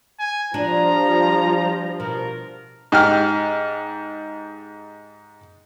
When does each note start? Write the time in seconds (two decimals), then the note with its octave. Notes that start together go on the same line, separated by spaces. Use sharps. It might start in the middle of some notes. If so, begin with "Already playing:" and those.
0.19 G#5
0.54 F3 G3 D4 F4 A#5
2.00 B2 A#4
2.92 G#2 G4 F6